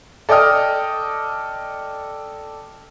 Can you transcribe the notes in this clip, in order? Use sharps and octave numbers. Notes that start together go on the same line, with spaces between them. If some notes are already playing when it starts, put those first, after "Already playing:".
A4 D5 D#5 G5 D#6 F6